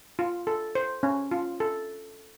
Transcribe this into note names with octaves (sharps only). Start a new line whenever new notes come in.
F4
A4
C5
C#4
F4
A4